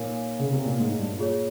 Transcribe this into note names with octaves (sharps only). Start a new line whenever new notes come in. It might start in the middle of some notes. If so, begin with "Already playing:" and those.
Already playing: A#2 D#4 A#4 C#5 F5 G#5
C#3
C3
A#2
G#2
G#2
G2
A#2
F4 G#4 C#5